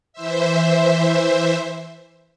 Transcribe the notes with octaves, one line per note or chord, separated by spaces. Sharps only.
E3 C5 E5